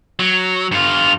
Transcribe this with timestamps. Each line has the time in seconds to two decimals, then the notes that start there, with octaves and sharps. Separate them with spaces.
0.19 F#3
0.72 G2 F4